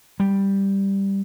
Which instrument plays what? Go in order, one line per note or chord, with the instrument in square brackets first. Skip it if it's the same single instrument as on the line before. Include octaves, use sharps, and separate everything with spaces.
[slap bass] G3